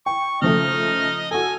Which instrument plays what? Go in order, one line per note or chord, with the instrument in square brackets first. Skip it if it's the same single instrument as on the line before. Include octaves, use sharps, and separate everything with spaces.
[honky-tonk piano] G5 [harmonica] C#6
[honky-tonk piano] C#3 F3 A3 [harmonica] D#4 D#5 F6
[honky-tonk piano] F#4 A4 [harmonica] G#5